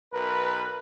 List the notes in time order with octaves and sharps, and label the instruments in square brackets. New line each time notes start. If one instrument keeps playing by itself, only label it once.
[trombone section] B1 A#4 B4